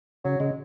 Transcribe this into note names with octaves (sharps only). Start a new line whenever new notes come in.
C#3 F#3
C#3 G#3